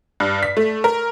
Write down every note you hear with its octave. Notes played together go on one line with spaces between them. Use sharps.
G2
B6
A3
A#4